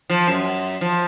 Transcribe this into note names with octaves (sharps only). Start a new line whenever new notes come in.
F3
F#2
F3